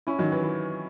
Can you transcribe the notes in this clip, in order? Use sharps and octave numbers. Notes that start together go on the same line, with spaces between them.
C#4 E4
D#3 F#3
E3
E3